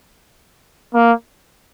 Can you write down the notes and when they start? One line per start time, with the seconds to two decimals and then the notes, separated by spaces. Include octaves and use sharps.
0.95 A#3